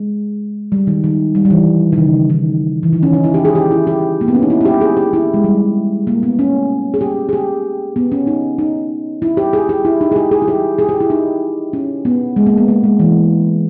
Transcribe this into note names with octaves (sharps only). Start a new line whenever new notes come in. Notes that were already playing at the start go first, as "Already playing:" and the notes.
Already playing: G#3
G3
D#3
D#3
G3
G3
E3
D#3
C#3
D#3
E3
D#3
C#4
D#4
E4
G4
G#4
G4
E4
G4
A#3
B3
C#4
D#4
E4
E4
G4
G#4
G4
E4
G#3
G3
A#3
B3
C#4
G#4
G4
G#4
G4
B3
C#4
D#4
D#4
E4
G4
G#4
G4
E4
D#4
G#4
G4
G#4
E4
G4
G#4
G4
E4
D#4
C#4
B3
G#3
A#3
B3
A#3
G#3
E3